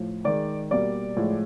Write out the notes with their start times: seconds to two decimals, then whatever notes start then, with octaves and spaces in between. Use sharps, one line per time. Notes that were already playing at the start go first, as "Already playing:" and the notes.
Already playing: A2 F3
0.24 D#3 G#3 D5
0.71 B2 G3 A#3 D5
1.17 A2 F3 G#3